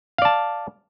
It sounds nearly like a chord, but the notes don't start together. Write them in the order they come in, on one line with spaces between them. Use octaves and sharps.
F5 D5 A5